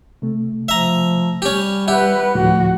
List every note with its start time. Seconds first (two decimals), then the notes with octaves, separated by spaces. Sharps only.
0.22 C3 A3
0.69 F3 E5 A#5
1.42 G3 C#4 G4
1.88 G4 B4 E5 F#5
2.35 D2 A2 F3 F#4